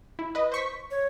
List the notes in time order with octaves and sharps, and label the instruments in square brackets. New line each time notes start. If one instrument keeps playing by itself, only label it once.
[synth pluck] E4
B4 D#5
C5 C#6 B6
[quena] C#5